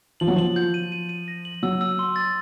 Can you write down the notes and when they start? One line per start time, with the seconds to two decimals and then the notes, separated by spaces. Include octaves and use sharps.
0.20 F3 F#7
0.28 F#3
0.35 F3 F#7
0.56 G6
0.74 D#7
0.92 D#7
1.09 D#7
1.28 A#6
1.45 F#7
1.63 F#3 E6
1.81 E6
1.99 C6
2.16 A6